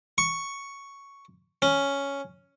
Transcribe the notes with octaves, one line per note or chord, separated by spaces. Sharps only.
C#6
C#4